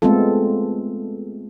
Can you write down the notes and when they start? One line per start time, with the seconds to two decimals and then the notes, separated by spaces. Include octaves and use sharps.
0.02 G#3 A3 B3 C4 F4 A4